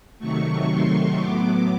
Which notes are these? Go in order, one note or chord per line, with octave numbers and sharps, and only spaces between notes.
C3 D#3 F#3 A3 C#6
C6
A2 F#3 B3 D6